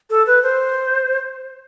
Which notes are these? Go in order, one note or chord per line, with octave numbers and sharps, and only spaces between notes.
A4
B4
C5